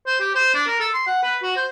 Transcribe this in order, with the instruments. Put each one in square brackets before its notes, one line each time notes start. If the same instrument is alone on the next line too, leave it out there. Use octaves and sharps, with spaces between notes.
[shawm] C5
G4
C5
D4
A#4
A4
C6
F#5
B4
F#4
C5